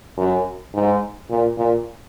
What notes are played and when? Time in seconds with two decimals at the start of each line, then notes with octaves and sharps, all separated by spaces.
0.17 F#2
0.74 G#2
1.29 A#2
1.57 A#2